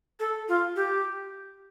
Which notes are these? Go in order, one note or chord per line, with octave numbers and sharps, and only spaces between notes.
A4
F4
G4